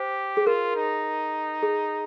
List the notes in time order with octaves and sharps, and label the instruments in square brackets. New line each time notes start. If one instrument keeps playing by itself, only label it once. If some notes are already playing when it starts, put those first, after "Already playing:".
Already playing: [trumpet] G4 [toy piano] C5
[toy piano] G#4
[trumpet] F4 [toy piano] A#4
[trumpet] D#4
[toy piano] G#4